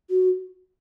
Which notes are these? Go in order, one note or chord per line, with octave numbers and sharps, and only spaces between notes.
F#4